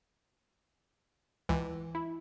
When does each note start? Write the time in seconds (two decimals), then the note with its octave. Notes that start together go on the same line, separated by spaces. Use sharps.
1.49 C#2 E3
1.95 E4